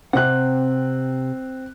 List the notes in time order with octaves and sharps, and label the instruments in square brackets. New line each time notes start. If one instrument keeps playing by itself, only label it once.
[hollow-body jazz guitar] C3 F#5 [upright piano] C4 F#6